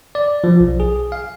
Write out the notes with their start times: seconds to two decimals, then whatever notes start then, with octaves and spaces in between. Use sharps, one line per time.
0.15 D5
0.44 F3
0.60 B1
0.80 G#4
1.12 F5